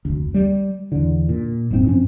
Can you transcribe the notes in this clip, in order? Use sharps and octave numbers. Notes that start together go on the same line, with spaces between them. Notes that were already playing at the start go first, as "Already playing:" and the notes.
F1 D2
G3
E2 D3
A#2
D#1 G#2 G#3 C4
G2 F3 C4 C#4